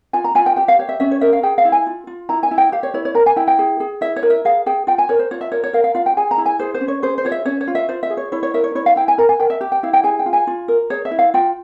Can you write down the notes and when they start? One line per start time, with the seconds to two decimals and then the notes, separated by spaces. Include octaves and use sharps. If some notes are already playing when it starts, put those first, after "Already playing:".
0.13 F4 G#5
0.24 A#5
0.35 F4 G#5
0.46 G5
0.56 G4 G5
0.68 F5
0.79 G4 C#5
0.89 E5
1.00 C#4 E5
1.11 C#5
1.21 A#4 E5
1.33 F5
1.43 G#4 G5
1.58 F5
1.65 E4
1.72 G#5
1.87 F4
2.07 F4
2.29 E4 A#5
2.43 G#5
2.51 E4
2.58 G5
2.72 G4 F5
2.83 C#5
2.94 E4 C#5
3.05 C#5
3.15 A#4 A#5
3.26 G#5
3.36 E4 G5
3.48 G5
3.59 G#4
3.80 G#4
4.01 E4 E5
4.16 C#5
4.23 A#4
4.30 E5
4.45 G#4 F5
4.66 G#4 G5
4.87 F4 G5
4.98 G#5
5.09 A#4 C#5
5.19 C5
5.31 F4 C#5
5.41 E5
5.52 A#4 C#5
5.64 C#5
5.73 A#4 F5
5.84 F5
5.95 F4 F5
6.06 G5
6.17 G#4 G#5
6.31 A#5
6.38 E4
6.46 G#5
6.59 G#4 C5
6.74 C5
6.81 C#4
6.88 C#5
7.02 G#4 C5
7.18 C5
7.25 F4 C#5
7.32 E5
7.46 C#4 C#5
7.61 C#5
7.67 F4
7.75 E5
7.89 F4 C5
8.03 E5
8.10 G#4
8.17 C#5
8.32 E4 C#5
8.43 C#5
8.54 A#4 E5
8.64 C#5
8.75 E4 C#5
8.86 F5
8.96 E4 G5
9.08 G#5
9.18 A#4 A#5
9.29 G#5
9.40 A#4 G5
9.50 E5
9.61 G4
9.72 G5
9.83 E4 F5
9.93 G5
10.04 G#4 G#5
10.19 G5
10.26 F4
10.33 G#5
10.47 F4
10.68 A#4
10.90 G#4 C#5
11.05 E5
11.11 E4
11.19 F5
11.34 F4 G5